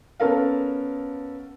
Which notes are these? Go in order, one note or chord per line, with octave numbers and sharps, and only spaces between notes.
B3 C#4 A4 A#4 F5